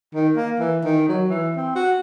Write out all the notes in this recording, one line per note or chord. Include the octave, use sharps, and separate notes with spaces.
D#3
A#3
E3
D#3
F#3
E3
C4
F#4